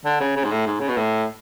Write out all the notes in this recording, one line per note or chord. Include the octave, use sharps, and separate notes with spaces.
D3
C#3
C#3
G#2
A2
G#2
C#3
B2
A2